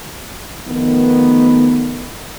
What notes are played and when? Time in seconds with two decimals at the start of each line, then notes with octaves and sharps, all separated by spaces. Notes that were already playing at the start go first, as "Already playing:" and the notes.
0.67 D#3 F3 A3 B3